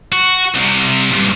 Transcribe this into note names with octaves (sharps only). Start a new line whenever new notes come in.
F#4
C2 C3
G2 A#2